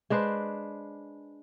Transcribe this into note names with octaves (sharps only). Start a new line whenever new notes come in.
G#3 D4 B4 C5